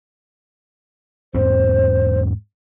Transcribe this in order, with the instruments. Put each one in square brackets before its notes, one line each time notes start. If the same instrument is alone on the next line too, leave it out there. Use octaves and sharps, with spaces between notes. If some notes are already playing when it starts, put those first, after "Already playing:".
[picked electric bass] E2 G#2 C4 [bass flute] C5